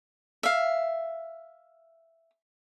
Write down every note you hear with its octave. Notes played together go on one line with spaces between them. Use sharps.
E5 F5